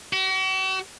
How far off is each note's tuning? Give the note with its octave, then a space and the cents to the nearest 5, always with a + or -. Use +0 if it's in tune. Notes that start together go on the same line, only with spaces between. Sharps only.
F#4 +45